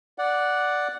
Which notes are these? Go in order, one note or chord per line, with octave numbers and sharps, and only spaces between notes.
D5 F#5